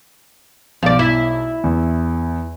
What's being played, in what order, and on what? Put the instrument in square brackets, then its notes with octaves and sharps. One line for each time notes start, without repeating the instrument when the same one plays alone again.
[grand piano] B1 [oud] F3 D5
[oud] E4
[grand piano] E2